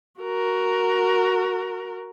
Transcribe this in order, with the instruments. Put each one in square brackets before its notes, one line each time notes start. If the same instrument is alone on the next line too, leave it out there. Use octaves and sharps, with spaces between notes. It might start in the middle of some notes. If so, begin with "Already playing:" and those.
[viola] F#4 A#4